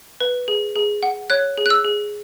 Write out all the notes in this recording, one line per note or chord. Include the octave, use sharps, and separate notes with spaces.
B4
G#4
G#4
F#5
C#5 F#6
G#4
F#6
E6
G#4